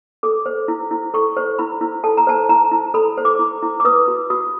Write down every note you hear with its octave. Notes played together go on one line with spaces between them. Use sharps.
A4 D6
C5
E4
E4
A4 C#6
C5
E4 B5
E4
A4 A5
A#5
C5 A5
E4 A#5
E4
A4 B5
C5
D6
E4
E4
D6
B4 D#6
F#4
F#4 D#6